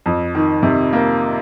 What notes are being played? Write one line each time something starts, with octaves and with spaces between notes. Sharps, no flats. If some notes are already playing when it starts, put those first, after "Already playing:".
F2
D#3
C3
A#3